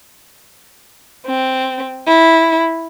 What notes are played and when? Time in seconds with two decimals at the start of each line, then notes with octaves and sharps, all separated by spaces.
1.26 C4
2.07 E4